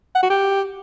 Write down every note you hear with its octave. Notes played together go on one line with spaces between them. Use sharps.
F#5
F#4
G4